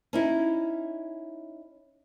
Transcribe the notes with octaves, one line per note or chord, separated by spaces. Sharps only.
C#4 D#4 E4